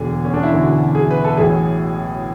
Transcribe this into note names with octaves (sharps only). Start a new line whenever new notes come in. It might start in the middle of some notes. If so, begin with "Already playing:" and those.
Already playing: E1 D2 D3 G#4
C#4
D4
E4
E1 D2 D3 F#4
G#4
B4
A4
A1 A2 F#3 G#4